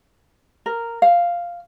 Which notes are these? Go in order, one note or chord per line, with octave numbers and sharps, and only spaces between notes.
A#4
F5